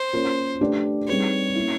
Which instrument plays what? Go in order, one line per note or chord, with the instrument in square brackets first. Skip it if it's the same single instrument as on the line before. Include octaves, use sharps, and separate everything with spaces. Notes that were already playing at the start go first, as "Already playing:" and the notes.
Already playing: [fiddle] C5
[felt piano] A#3 C#4 F4 A#4 C#5
A3 D4 G4 B4 D5
[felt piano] G3 C4 D#4 G#4 B4 [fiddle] C#5
[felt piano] A#3 C#4 E4